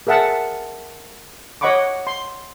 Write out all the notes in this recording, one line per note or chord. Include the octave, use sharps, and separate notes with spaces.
G#4 A#4 E5 F#5 A5
C#5 D#5 F#5 B5 C#6 D6
C6